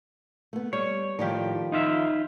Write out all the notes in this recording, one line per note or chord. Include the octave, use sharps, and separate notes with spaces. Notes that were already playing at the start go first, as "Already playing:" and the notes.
A3 B3
G3 C#5
A2 D#3 F3 G4 D5
D#4 F4 E5